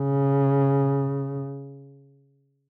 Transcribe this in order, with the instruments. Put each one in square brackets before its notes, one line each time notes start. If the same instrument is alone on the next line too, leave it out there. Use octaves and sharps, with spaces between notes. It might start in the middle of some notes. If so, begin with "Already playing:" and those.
Already playing: [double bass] C#3